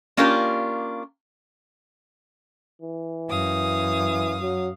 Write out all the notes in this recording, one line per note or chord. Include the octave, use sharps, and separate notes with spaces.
A#3 C#4 D4 F4 G4 A#4
E3
F#2 F5 D#6
F#3